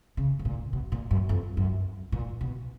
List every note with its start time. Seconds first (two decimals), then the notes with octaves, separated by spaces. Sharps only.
0.17 C#3
0.39 G#2
0.45 A#2
0.73 B2
0.92 A#2
1.11 F#2
1.29 F2
1.57 F#2
2.12 A#2
2.41 B2